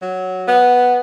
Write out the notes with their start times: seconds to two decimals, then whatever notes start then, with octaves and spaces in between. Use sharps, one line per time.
0.02 F#3
0.46 B3